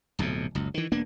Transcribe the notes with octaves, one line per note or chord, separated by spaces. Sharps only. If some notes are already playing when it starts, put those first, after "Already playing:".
D1 B1 F2 C3
F#1 C#2
D#3 E3
E1 A#3 B3 D4